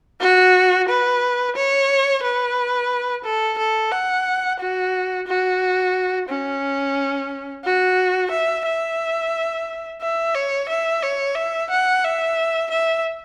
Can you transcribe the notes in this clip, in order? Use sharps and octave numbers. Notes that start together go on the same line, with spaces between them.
F#4
B4
C#5
B4
A4
A4
F#5
F#4
F#4
C#4
F#4
E5
E5
E5
C#5
E5
C#5
E5
F#5
E5
E5